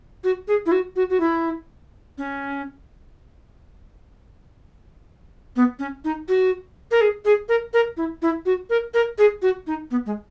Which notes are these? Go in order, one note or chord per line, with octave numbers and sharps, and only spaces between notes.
F#4
G#4
E4
F#4
F#4
F#4
E4
C#4
B3
C#4
D#4
F#4
A#4
G#4
G#4
A#4
A#4
E4
E4
F#4
A#4
A#4
G#4
F#4
D#4
B3
G#3